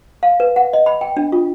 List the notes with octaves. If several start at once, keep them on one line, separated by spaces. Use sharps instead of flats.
F5
B4
F#5
D#5
B5
G5
D4
F4